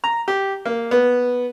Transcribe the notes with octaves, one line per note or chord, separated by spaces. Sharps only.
A#5
G4
A#3
B3